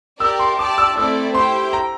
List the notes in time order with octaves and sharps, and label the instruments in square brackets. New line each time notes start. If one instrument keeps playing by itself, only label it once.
[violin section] G4 A#4 D5 [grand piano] E6
[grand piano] C6
[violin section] G4 D5 A5 [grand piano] D6
[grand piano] E6
[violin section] A3 C4 E4 A4 D5 [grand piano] E6
[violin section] E4 G4 C5 G5 [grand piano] C6
[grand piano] A#5